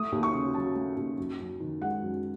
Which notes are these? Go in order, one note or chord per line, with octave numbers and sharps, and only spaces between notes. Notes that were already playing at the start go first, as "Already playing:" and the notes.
Already playing: A3 D#6
D#2
C#6
C#3
F#3 A5
A3
D#2
F#2
F#2
D#3
G#3 F#5
F#2